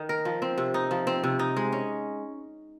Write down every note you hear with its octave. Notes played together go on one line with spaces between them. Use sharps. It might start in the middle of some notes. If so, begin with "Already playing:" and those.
Already playing: D#3 D#4
A#4
F3
C4
C3
D#4
F3
C4
C3
D#4
G#3
C#4